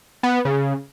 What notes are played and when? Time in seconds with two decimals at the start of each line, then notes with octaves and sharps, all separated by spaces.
0.23 B3
0.45 C#3